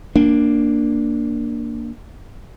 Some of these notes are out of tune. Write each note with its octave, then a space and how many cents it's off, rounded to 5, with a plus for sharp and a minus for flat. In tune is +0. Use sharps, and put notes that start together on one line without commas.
A#3 +0 D4 +0